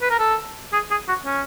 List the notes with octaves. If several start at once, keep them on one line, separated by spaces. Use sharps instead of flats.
B4
A#4
A4
G#4
G#4
F#4
C#4